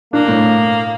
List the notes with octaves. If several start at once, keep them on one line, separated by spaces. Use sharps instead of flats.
A#3 D4
A2